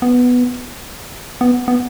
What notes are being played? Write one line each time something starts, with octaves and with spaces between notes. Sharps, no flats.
B3
B3
B3